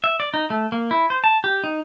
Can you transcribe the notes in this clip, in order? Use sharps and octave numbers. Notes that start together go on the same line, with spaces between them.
E5
D5
D#4
A3
A#3
E4
C5
A5
G4
D#4